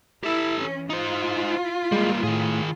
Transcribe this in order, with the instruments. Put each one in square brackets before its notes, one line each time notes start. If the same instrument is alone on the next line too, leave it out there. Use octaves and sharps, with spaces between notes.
[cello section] E4 [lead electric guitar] G4 A4
[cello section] E3 C#4
[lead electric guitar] D#4 C5 [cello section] F4
[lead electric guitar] G3 A#3 [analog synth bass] G#3
[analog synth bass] A2 [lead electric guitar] D#3 G#4